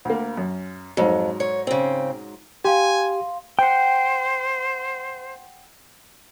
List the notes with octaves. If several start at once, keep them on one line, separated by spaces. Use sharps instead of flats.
D2 A#3
F#2
F2 G#2 F#3
C#5
C#3 C4
G4 F5 G#5 C6
C5 F#5 G5